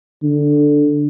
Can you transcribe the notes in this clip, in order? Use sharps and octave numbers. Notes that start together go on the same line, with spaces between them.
D3